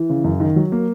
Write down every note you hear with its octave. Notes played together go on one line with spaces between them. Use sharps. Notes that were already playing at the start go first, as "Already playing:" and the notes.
Already playing: E3
C#3
F#2
D#3
F#3
A#3